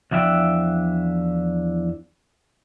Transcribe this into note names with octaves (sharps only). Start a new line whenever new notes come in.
E2 F3 D4 E5 G5